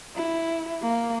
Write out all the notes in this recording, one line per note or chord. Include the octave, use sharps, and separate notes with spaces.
E4
A#3